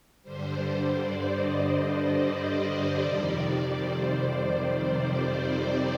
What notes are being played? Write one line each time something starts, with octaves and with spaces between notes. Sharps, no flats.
G2 D3 G3 C5
C5
D5
D#5
D5
D5
F2 C3 D#3 G3
C5